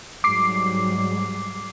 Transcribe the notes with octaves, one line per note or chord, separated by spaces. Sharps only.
G#2 F#3 G3 D6 C7